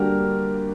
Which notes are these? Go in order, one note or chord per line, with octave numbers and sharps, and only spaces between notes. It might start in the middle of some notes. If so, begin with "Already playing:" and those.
Already playing: D3 G3 A#3 D4 F#4 G4 A#4